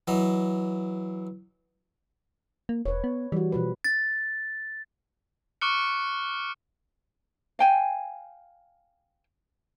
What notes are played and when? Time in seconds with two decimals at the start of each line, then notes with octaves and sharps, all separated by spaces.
0.07 E3 F#3 D#5
2.69 A#3
2.85 E1 B4 C#5
3.04 B3
3.32 E3 G3 F#4
3.52 B2 F3 B4
3.84 A6
5.61 C#6 D6 F6 F#6 C#7
7.59 F5 G5 G#5